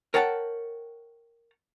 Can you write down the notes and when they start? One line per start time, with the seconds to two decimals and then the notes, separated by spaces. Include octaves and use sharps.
0.14 A#4 C#5 F#5 G5 A5